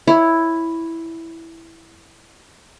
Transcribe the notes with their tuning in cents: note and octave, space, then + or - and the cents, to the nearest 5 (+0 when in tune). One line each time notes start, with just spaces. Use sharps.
E4 +0 C#5 +0